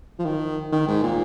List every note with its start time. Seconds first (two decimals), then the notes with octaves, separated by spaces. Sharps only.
0.19 F3
0.25 D#3
0.72 D#3
0.87 G#2
1.03 A#2